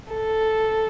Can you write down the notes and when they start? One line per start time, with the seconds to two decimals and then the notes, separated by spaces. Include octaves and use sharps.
0.12 A4